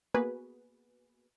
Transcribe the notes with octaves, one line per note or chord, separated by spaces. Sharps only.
A#3 B3 F#4 G#4 B4